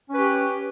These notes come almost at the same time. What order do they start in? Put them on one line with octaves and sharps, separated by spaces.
C#4 B4 G4